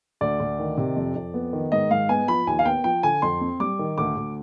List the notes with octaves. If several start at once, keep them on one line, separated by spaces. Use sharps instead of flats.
D2 D5
D2
D#3
C3
F2
F2
B3
D#3
G#2 D#5
G#2 F5
B3 G#5
F3 B5
D#2 G#5
F5
B3 G5
F3 G5
D3 G#5
F2 C6
C4
G3 D6
D#3
D2 D6
D2